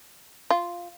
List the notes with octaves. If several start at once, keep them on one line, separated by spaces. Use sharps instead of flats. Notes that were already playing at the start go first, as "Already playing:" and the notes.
F4